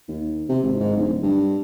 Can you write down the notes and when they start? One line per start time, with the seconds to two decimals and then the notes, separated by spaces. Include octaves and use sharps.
0.08 D#2
0.49 C3
0.63 G#1
0.80 G#2
0.97 D1
1.23 G2